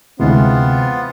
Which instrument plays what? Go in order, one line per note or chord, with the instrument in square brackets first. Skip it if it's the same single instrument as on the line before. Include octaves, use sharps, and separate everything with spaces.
[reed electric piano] D2 C3 [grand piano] E3 G#3 E4 [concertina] B3 F4 [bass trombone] C4